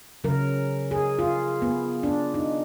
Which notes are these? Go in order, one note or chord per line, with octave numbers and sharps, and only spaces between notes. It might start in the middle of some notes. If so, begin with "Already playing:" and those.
C#3 F#3 A#4
G#4
F4
B3
D4
D#4